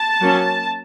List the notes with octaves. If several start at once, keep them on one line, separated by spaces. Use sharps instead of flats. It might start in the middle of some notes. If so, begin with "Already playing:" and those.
Already playing: A5
F#3 A#3 C#4